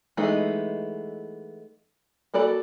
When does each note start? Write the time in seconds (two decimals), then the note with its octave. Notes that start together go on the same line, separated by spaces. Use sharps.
0.17 E3 G#3 A3 B3 D#4
2.34 A#3 F#4 A4 D5 B5